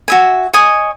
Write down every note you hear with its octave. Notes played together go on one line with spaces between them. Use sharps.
F#4 E5 G#5
C#5 D#5 G#5 D#6